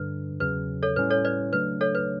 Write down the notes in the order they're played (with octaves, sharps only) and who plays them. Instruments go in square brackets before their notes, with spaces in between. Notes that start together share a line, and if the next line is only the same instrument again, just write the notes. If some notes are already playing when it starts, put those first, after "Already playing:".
Already playing: [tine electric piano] G2 D3 G3 D4 [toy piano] B4
[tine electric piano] E2 C#3 F#3 [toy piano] B4
[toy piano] A4 C#5
[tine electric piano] A2 G3 C#4 E4 [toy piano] B4
[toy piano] A4 C#5
B4 D5
[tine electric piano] C#3 F#3 A3 D4 [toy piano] B4
[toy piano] A4 C#5
B4